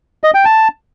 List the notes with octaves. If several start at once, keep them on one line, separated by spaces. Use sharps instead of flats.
D#5
G5
A5